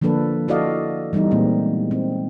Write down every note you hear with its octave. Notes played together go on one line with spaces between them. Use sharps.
D3 F3 A#3 D4 A4 B4
E4 F#4 A4 D5 D#5 F5
E3 G3 B3 D#4
A#2 G#3 A#3 C4
C4